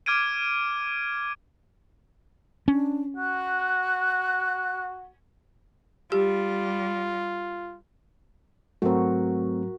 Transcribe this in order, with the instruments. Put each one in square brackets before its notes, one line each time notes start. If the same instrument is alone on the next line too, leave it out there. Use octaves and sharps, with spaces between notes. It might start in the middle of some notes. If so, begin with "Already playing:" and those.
[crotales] D6 F6 G#6 D7 D#7
[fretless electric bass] C#4 [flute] D4
[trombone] F#4 [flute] F#6
[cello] G3 [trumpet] F4 [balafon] G4
[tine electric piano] G#2 F#3 [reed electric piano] A3 C4 [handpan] F#4 A#4